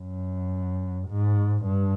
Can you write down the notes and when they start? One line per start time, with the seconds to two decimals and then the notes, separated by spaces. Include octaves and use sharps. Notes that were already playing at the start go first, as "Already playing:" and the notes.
Already playing: F#2
1.08 G#2
1.65 G2